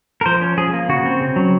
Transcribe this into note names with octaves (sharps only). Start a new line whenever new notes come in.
A#4
F3 C5
C#4
F3 G#4
A#3
C#3 F#4
C4
C#3
F#3